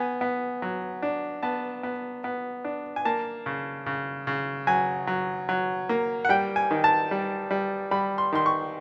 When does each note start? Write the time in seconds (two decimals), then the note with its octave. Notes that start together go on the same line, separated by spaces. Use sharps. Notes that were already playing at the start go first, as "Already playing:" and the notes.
Already playing: B3 G#5
0.21 B3
0.62 F#3
1.02 D4
1.43 B3 A5
1.83 B3
2.24 B3
2.64 D4
2.96 G#5
3.05 A#3 A5
3.46 C#3
3.86 C#3
4.27 C#3
4.67 F#3 G#5
5.07 F#3
5.49 F#3
5.89 A#3
6.25 F#5
6.29 G3 G5
6.56 G#5
6.71 D#3
6.84 A5
7.11 G3
7.51 G3
7.91 G3 B5
8.18 C6
8.33 D#3 C6
8.46 C#6